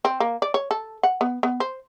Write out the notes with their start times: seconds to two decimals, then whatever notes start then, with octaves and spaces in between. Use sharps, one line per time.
0.05 C4
0.20 A#3
0.42 D5
0.54 C#5
0.71 A4
1.03 F#5
1.21 B3
1.43 B3
1.60 C5